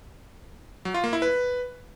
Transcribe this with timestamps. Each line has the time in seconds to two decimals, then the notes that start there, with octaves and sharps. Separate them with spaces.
0.85 F#3
0.94 F4
1.04 A#3
1.13 E4
1.22 B4